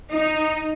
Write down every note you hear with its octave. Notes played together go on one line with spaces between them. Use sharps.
D#4